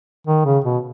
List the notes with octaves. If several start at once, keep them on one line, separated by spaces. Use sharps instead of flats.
D#3
C#3
B2